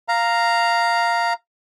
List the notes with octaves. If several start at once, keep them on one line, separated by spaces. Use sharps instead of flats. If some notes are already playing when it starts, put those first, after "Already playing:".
F5 A#5